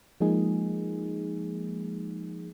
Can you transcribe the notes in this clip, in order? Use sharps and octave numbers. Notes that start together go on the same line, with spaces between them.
F3 G#3 A#3 D#4 G#4